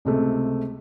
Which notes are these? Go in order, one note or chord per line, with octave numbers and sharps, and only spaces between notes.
C#2 C3 A3